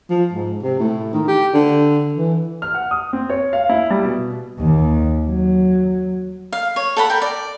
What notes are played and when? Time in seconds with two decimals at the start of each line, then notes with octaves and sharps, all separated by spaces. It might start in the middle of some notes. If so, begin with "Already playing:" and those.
0.10 F3
0.33 G#2
0.63 C3
0.80 A2
1.14 D#3
1.28 G4
1.54 D3
2.16 E3
2.62 F6
2.74 F#5
2.91 D#6
3.13 C4
3.30 C#5
3.53 F5
3.69 E4
3.90 G3
4.04 B2
4.60 D#2
5.27 F#3
6.53 F5
6.76 C#5
6.97 A4 F#5 B5
7.10 A#4 G5
7.22 D5